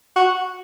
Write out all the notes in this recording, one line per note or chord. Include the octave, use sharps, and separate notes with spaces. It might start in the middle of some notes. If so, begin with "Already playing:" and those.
F#4